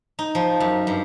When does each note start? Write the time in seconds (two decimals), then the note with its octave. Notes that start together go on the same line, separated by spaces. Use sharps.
0.19 D#4
0.35 F3
0.60 F#2
0.87 G2